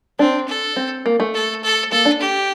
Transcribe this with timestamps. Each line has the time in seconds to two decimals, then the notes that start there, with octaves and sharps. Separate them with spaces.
0.19 C4 D4
0.48 A4
0.76 C4
1.06 A#3
1.20 A3
1.34 A4
1.63 A4
1.91 A#3 A4
2.05 D4
2.21 G4